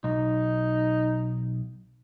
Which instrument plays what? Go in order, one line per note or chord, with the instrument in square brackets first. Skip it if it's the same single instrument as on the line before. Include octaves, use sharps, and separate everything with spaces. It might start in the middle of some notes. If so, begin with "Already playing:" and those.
[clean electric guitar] B1 [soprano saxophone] D#4